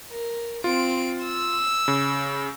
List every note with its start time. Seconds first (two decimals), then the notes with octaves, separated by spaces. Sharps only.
0.10 A#4
0.64 C4 F4 D7
1.24 E6
1.88 C#3